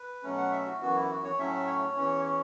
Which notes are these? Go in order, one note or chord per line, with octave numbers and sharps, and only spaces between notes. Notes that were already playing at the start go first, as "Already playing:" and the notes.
Already playing: B4
B2 F#3 A3 C#4
F#5
E5
F#4
F#2 E3 B3 F#4
E4
F#4
C#5
A2 F#3 A3 C#4 E5
C#5
E2 E3 C#4
C#5